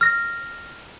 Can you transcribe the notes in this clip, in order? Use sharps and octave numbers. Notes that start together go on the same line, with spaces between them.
F6 A#6